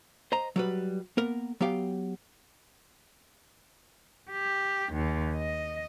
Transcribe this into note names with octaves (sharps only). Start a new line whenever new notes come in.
C5 D#5 A#5
F#3 G3 B4
A#3 B3 A#4
F#3 B3 G4 F5 G5
G4
D#2
D#5